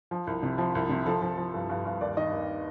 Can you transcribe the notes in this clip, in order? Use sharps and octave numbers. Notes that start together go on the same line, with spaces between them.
F3
C2
C3
F3
C2
C3
F3 A4
F3
F3
G2
G2
G2
D#2 D5
D#3 D#5
D#2